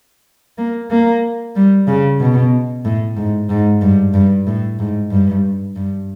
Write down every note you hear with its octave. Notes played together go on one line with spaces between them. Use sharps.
A#3
A#3
G3
C#3
B2
A2
G#2
G#2
G2
G2
A2
G#2
G2
G2